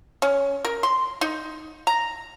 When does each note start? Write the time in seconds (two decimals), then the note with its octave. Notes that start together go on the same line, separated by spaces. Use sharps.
0.22 C#4
0.65 A#4
0.83 C6
1.21 D#4
1.87 A#5